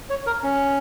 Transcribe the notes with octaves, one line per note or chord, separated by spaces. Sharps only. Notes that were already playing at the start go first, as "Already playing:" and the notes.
C#5
A#4
C#4